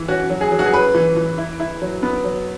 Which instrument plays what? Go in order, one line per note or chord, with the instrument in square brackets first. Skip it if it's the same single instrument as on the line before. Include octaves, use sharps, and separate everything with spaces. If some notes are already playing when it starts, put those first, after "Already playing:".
Already playing: [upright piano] E3
C#4 F#4
F#3
G#4
F#3
F#4
G#4
C#4 B4
E3
E3
E4
E4
F#3
B3
F#3